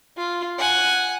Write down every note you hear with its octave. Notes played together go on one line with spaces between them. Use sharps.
F4
F#5 G#5